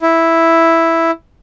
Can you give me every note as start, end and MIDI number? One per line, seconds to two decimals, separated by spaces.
0.02 1.11 64